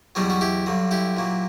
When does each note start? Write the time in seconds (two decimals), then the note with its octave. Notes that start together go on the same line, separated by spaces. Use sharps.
0.15 E2 B2 F#3 G3 B3
0.30 F#4
0.41 E4 G4
0.66 G2 D3 F#3
0.91 E4 G4
1.17 A#2 F#3